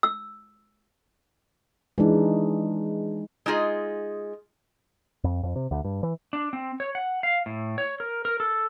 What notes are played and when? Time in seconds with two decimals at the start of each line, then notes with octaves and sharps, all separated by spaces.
0.03 E6
1.98 E3 G#3 D4 D#4
3.46 G#3 D#4 F4 G#4
5.24 F2
5.43 F2
5.56 C3
5.71 D2
5.84 G2
6.03 E3
6.33 D4
6.53 C4
6.80 C#5
6.95 F#5
7.23 F5
7.46 A2
7.78 C#5
8.00 A#4
8.25 A#4
8.40 A4